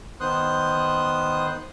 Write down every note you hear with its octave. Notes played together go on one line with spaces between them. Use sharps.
D#3 B3 C5 C6 D#6 F#6